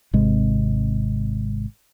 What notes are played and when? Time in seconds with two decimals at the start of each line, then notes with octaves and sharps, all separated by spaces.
0.13 G#1 C3 G#3